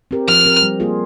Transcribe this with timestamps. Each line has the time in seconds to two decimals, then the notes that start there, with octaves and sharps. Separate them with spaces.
0.11 C4 G4 A#4
0.28 F3 F6
0.46 C4 G4 A#4
0.62 G3
0.80 A#3 F4 G#4